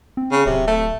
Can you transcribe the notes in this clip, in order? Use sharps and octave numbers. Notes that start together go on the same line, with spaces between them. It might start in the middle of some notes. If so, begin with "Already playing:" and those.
C4
C#3
D1 C3
A3